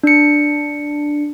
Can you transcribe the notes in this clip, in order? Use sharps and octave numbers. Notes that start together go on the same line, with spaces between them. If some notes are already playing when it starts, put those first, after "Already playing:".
D4 C#7